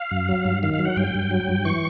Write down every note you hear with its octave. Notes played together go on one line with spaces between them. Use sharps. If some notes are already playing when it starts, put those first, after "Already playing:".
Already playing: F5
F#2
F#3
G2
D#3 F5
F5
F#3
F#5
G2 G5
G2
F#3
G2
E3 C#6